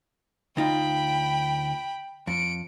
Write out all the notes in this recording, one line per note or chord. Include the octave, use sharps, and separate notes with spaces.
D2 D#4 F4 G5 B5
F2 C#7 D7